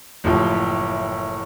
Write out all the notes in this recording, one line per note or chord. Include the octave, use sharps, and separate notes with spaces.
F#1 A2 F3 G4